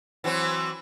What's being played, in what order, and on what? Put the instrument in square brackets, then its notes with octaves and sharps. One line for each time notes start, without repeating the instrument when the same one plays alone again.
[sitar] E3 F#3 C4